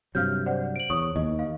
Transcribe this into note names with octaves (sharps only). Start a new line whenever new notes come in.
G2 C3 F#3 F5 F6 G6
C5 D5 F#5
D7 F#7
E2 C#5 C#6 D#6
D#2 D#5
F5